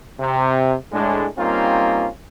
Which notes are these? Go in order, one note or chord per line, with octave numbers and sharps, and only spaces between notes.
C3
A2 G#3 D4
G3 A#3 C4 C#4 D#4 F4